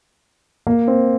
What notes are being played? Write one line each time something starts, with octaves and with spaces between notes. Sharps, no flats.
A#3
C4